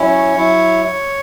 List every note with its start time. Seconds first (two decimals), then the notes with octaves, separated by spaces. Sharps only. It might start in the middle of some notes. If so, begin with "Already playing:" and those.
Already playing: F#3 C#4 E4
0.09 C#5
0.35 F#3 E4